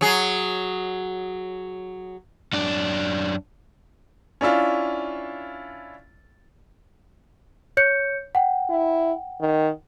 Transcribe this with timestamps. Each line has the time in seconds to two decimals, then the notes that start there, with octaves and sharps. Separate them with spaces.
0.01 F#3 G#4
2.53 F#2 D4
4.41 C#4 D4 E4 F4
7.77 C#5 G6 C#7
8.35 F#5 G5
8.70 E4
9.41 D#3